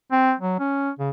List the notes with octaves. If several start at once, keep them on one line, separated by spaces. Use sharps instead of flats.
C4
F#3
C#4
C#3